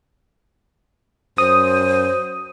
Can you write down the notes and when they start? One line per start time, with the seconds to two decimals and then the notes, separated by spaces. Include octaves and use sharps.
1.38 F#2 C5 D#6